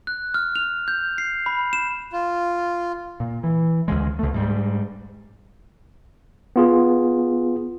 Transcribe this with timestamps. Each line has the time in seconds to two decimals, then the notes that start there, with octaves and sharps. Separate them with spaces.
0.07 F#6
0.34 F6
0.56 F7
0.88 G6
1.18 C7
1.46 B5
1.73 E7
2.13 F4
3.20 A#2
3.43 E3
3.88 D2 C#3 G#3
4.19 C#2 A3
4.34 G#2 G3
6.56 B3 F4 G#4